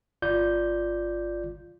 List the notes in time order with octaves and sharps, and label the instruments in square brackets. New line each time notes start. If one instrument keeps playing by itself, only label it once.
[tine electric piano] G1 F4 D5 G6